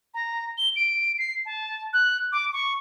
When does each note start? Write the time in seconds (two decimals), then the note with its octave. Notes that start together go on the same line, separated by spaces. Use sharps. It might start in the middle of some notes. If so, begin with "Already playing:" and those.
0.14 A#5
0.58 G7
0.76 D7
1.18 C7
1.46 A5
1.93 F#6
2.32 D6
2.53 C#6